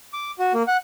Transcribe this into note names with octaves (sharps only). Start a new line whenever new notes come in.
D6
F#4
A#3
F#5